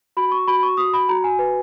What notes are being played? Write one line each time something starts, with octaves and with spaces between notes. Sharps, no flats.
F#4 B5
C#6
F#4 B5
C#6
F#4 D#6
B5
F#4 A#5
G#5
B4